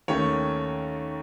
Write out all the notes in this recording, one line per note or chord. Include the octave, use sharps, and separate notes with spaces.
D#2 D#3 A3 C#4 C#5